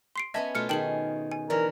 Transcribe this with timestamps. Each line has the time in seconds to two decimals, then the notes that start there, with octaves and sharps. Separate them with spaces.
0.16 C6 C7 D7
0.34 B3 C#4 D#5 E5 G#5 A5
0.55 B2 A3 F4 F6 C#7
0.69 D#3 G#4 G5 A5 F#7
1.32 G#5
1.50 D3 E3 A#4 C#5 D5